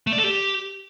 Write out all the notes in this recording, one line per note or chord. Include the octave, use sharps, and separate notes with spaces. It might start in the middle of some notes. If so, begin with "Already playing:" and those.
A3
D5
A4
G4